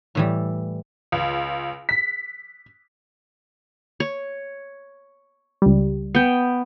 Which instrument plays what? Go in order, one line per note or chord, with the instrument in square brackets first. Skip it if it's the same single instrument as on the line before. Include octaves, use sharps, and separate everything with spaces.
[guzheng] A2 E3 G3
[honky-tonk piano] C#2
B6
[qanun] C#5
[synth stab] C#2 G3
[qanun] B3 G5